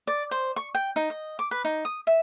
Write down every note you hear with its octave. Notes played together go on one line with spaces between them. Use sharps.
D5
C5
C#6
G5
D#4
D#5
D6
B4
D#4
D#6
E5